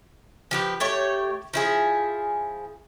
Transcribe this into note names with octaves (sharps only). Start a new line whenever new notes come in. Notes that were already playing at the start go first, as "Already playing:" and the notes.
F3 G4 B4
A3 G4 C#5
F3 E4 G#4